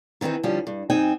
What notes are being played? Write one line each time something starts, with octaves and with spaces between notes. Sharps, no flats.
D#3 E3 C4 D4 D#4
D3 F3 G3 C#4
G2
F#2 C4 D#4 G5 G#5